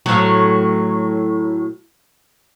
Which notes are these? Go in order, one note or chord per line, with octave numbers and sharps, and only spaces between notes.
A2 F#3